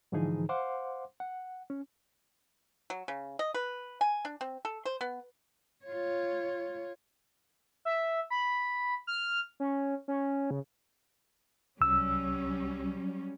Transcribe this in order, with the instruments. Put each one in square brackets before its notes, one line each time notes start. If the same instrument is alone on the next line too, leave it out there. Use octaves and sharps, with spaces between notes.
[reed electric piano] G#2 D3 E3 F3 D#4 G#4
C5 F5 F#5 C6 D6
F#5
C#4
[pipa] F#3
C#3
D#5
B4
G#5
D4
C4
A4
C5
B3
[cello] F4 C#5
[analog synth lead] E5
B5
F6
C#4
C#4
C#3
[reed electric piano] C2 E6 [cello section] F#3 G3 C#4